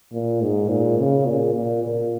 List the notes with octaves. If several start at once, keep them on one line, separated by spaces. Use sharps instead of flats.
A#2
G#2
A#2
C#3
A#2
A#2
A#2